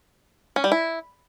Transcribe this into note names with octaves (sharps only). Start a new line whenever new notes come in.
C#4
G3
E4